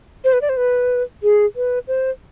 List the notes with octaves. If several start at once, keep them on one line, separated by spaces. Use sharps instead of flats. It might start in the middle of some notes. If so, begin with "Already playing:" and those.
C5
B4
D5
C5
B4
G#4
B4
C5